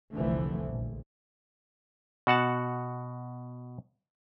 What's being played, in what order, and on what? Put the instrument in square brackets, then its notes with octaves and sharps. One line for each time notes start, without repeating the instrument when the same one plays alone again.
[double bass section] F1 C2 D3 E3 F3 A3
A#1
[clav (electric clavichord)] B2 F#4 F#5 A5